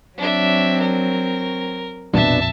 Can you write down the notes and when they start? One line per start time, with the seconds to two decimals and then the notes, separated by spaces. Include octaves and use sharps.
0.18 F#3 C4 D4 E5
0.81 A#4
2.13 A#1 F2 B2 D4 E5 A5